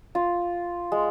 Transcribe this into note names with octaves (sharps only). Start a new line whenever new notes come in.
F4
G#3